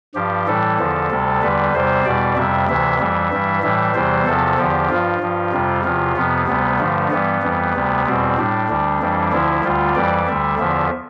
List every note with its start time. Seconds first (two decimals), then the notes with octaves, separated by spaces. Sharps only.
0.15 G2 F3 G4
0.47 A2 E3 G3 A4
0.78 E2 D3 F3
1.11 D2 C3 G3
1.42 E2 D3 G3 B4
1.73 E2 C3 G3 C5
2.05 E2 B2 G3 D5
2.36 F2 C3 G3 E5
2.68 D2 C3 E3 E5
2.99 F2 E3 G3 E5
3.32 G2 E3 G3
3.63 A2 E3 G3 E5
3.94 E2 C3 E3 G3 C5
4.26 E2 C3 F3 A4
4.58 E2 D3 F3 G4
4.89 G2 F3 F4
5.21 G2 F3
5.52 F2 C3 G3
5.84 E2 C3 F3 F4
6.16 F2 C3 F3 B3
6.48 D2 C3 G3 B3
6.79 G2 D3 F3 A3
7.10 G2 E3 G3 B3
7.42 F2 E3 G3
7.75 D2 C3 G3
8.06 E2 B2 G3 C4
8.38 A2 G3 D4
8.69 D2 D3 G3
9.00 F2 E3 G3
9.32 D2 D3 F3 E4
9.63 D2 D3 G3 F4
9.95 F2 E3 G3 D5
10.27 D2 D3 G3 E5
10.58 E2 D3 F3 E5